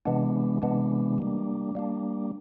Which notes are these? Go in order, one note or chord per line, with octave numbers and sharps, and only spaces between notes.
C3 E3 G#3 B3 D4
C3 E3 G#3 B3 D4
G3 A#3 D4
G3 A#3 D4